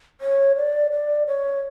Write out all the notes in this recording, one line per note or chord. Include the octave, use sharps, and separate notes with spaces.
C#5
D5
D5
C#5